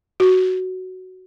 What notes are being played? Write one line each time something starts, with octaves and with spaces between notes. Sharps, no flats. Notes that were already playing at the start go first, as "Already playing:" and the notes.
F#4